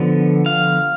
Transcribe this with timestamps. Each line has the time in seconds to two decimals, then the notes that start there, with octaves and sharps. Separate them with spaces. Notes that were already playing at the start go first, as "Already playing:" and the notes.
Already playing: D3 F3 B3
0.46 F5